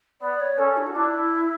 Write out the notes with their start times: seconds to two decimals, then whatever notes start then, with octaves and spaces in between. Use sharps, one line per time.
0.21 B3 D5
0.40 C#5
0.58 C#4 A4
0.77 D4
0.86 F#4
0.95 D4 E4